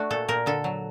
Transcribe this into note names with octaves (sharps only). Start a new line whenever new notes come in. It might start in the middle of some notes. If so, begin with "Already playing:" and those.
Already playing: A3 D4 F#4
A#2 A4
A#2 A#4
D3 A4
F#3